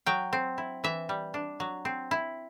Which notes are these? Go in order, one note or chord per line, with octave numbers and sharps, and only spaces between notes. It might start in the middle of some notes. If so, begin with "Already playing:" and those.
F#3 G5
C4
E4
E3 E5
G3
D4
F#3
C4
E4